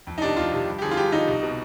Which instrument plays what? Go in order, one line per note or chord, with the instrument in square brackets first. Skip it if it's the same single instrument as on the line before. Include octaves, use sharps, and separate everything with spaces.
[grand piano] F2
D#4
C3 D#3 D4
F2 F4
C3 D#3
G2
G4
D3 F3 G#4
F4
G2 G4
D3 F3 D#4
C2
B2